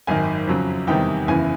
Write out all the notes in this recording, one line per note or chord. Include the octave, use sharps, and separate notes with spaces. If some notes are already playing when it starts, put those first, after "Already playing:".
G#1 F#2 D#3 G#5
F2 C#3 F#3
E2 C3 D#3 G3 G5
F#1 E2 C#3 E3 G#5